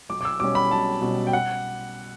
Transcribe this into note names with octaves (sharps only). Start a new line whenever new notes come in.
B1 D6
D6
E6
B2 G3 C#4 D6
B5
B1 A5
B2 G3 C#4
G5
F#5